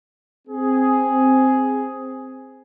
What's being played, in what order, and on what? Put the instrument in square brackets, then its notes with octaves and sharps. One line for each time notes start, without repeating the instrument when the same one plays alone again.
[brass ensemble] C4 G#4